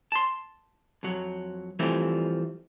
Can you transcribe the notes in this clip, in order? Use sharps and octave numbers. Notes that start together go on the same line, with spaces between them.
A5 C6
F2 F#3
E3 F3 G3 A3 C4